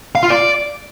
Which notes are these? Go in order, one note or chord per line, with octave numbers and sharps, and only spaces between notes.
F5
F4
D5